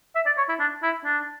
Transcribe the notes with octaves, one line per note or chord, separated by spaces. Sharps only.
E5
D5
C#5
E4
D4
E4
D4